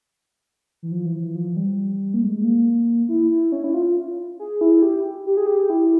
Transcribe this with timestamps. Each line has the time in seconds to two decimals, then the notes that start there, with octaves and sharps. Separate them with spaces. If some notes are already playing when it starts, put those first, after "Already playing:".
0.83 E3
0.92 F3
1.06 E3
1.20 E3
1.35 F3
1.56 G3
2.14 A#3
2.22 G#3
2.36 G#3
2.44 A#3
3.09 E4
3.31 E4
3.52 C#4
3.64 E4
3.74 F4
3.85 F4
4.39 G#4
4.61 E4
4.82 G4
5.26 G4
5.37 G#4
5.47 G4
5.70 E4